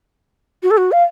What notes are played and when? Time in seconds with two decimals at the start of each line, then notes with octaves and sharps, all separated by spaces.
0.63 F#4
0.71 A4
0.77 F#4
0.92 F5